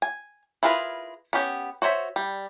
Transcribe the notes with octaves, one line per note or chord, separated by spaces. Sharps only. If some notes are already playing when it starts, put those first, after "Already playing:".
G#5
E4 F4 G#4 A#4 B4
B3 C#4 G4
F#4 C5 C#5 E5
G3